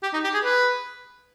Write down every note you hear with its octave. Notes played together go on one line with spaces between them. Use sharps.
G4
D#4
G4
G#4
B4